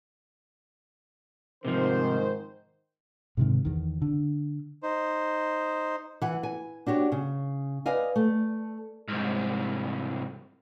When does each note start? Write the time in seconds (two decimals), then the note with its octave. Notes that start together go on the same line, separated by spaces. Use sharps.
1.65 G#2 C3 D#3 F3 C5
3.37 G#2 C3 D#3
3.65 E2 D#3
4.02 D3
4.83 D#4 C5
6.22 E3 F#5
6.43 G#5
6.86 D4 F#4 G4 C#5
7.12 C#3
7.86 B4 D5 D#5 F5 G#5
8.16 A3
9.08 C2 G#2